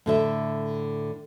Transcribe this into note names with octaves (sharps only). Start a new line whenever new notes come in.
A2 D3 E5